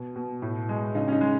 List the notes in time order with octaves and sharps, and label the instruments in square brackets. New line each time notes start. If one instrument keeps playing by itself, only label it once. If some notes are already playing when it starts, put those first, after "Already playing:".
Already playing: [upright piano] B2
B2
A2
G#3
C#3 D#4
C#4
D#4
G#3